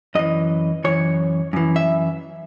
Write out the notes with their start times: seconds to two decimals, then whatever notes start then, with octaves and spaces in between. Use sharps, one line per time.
0.15 F#2 E3 D#5
0.84 F#2 E3 C#5
1.53 F#2 E3
1.76 E5